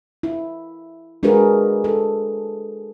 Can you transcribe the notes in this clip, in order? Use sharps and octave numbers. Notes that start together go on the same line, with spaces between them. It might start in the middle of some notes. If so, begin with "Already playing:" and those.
E4
G#3 D4 F#4 G#4 A#4 B4
A4